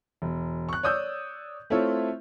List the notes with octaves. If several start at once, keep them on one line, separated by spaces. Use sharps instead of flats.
E1
C#6 F#6
C#5 D5 D#6 E6 G6
A3 C4 E4 F4 A4 C#5